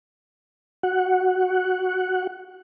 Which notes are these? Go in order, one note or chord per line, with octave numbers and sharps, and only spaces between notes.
F#4 F#5